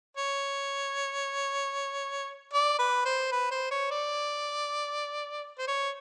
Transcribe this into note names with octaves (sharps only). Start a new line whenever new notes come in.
C#5
D5
B4
C5
B4
C5
C#5
D5
C5
C#5